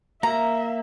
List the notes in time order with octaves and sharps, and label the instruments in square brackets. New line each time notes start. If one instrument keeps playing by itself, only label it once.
[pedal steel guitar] A#3 [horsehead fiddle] E5 [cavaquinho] A#5